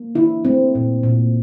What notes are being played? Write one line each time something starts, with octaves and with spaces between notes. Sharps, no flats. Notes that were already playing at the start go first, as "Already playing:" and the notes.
Already playing: A#3
D3 E4
A3 C4
A#2
A#2